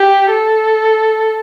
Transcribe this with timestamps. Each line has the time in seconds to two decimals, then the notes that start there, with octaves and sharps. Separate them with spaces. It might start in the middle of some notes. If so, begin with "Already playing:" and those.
Already playing: G4
0.30 A4